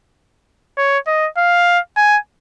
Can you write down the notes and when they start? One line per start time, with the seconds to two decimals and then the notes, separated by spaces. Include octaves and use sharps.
0.78 C#5
1.07 D#5
1.38 F5
1.97 G#5